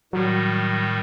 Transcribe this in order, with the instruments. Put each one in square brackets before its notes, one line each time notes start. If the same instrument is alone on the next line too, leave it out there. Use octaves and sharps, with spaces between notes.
[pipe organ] A2 D#3 G3 [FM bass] F#3